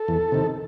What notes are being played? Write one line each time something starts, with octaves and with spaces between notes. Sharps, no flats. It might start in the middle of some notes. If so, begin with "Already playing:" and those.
Already playing: A4
E2
C3 D#3